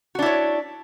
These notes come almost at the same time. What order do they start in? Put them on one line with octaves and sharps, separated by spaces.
F#4 D4 E4 C#5